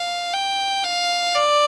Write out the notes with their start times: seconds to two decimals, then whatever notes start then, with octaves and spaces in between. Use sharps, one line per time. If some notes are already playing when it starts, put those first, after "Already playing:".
Already playing: F5
0.34 G5
0.84 F5
1.35 D5